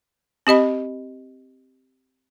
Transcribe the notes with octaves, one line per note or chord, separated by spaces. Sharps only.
C4 G4 D#5 B5